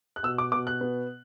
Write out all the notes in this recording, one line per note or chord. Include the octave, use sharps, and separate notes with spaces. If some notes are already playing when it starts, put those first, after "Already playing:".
F#6
B2 E6
D6
B2 D6
F#6
B3